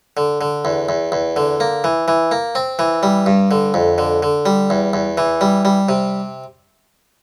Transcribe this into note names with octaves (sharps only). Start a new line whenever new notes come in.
D3
D3
E2
E2
E2
D3
A#3
E3
E3
A#3
C4
E3
G3
G2
D3
F2
D3
D3
G3
E2
E2
E3
G3
G3
C3